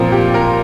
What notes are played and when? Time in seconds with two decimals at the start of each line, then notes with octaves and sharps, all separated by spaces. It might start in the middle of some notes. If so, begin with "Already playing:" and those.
Already playing: A#2 F3 C4 A#4
0.12 G4
0.34 A#4